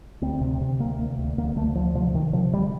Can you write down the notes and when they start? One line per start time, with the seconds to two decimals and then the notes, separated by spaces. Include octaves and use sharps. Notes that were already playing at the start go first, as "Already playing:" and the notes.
0.22 D2 C4
0.41 C3
0.61 C3
0.79 D2 A#3
0.99 D2
1.18 D2
1.37 D2 A#3
1.56 D2 A3
1.75 D2 F3
1.95 C3 F3
2.14 C3 D#3
2.33 C3 F3
2.53 D3 G3